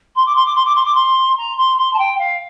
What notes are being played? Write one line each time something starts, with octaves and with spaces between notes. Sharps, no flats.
C6
D6
C6
D6
C6
D6
C6
D6
C6
A#5
C6
C6
A5
G5
F5